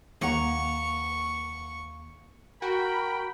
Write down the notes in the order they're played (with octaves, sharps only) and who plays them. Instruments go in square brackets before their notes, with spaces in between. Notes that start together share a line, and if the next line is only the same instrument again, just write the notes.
[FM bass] D#2 [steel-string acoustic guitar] A#3 F#5 A#5 [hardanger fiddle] C#6
[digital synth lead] F#4 [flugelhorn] A#4 [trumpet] G5 [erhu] B5